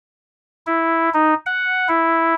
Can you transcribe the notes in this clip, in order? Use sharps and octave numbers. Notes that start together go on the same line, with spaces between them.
E4
D#4
F#5
E4